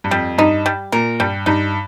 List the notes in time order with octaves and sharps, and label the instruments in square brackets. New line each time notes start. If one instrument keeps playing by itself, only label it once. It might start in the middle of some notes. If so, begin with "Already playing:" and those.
[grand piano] G2
[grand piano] F2 [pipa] G3
[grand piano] G2 [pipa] D#4
[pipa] G3
[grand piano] A#2 [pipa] A#4
[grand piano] G2 [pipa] G3
[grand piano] G2 [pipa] D#4